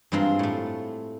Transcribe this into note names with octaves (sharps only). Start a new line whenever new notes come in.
G2 G#3 C4 F4 A#5
A2 A3